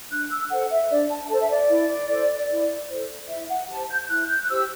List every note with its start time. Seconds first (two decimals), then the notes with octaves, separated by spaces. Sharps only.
0.11 D4 F#6
0.30 E6
0.50 A4 C5 F#5
0.70 E5
0.90 D4 D5
1.10 A5
1.30 A4 C5 A5
1.40 E5
1.50 D5
1.69 E4
2.10 A4 C5
2.50 E4
2.89 A4 C5
3.29 E4 E5
3.50 F#5
3.69 G4 C5 A5
3.89 G6
4.00 G6
4.09 E4 F#6
4.29 G6
4.41 F#6
4.49 G4 C5 E6